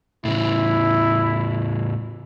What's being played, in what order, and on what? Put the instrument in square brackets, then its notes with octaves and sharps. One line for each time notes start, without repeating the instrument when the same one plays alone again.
[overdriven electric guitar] A2 C#3 [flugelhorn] E4